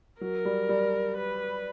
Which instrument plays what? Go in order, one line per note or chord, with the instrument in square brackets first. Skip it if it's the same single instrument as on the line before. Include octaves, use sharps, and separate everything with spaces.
[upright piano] F#3 [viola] A#4
[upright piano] G3
G3
[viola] B4